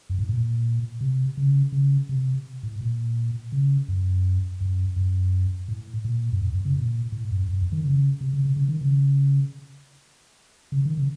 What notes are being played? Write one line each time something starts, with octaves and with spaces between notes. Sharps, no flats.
F#2
A2
A#2
C3
C#3
C#3
C3
A2
A#2
C#3
F#2
F#2
F#2
A2
A#2
F#2
F2
F#2
C#3
A#2
A2
F#2
F#2
F2
D#3
C#3
C3
C#3
C#3
C#3
D#3
C#3
C#3
D#3
C#3